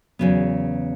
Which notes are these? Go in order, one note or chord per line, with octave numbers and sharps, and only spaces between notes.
E2 C#3 F#3 B3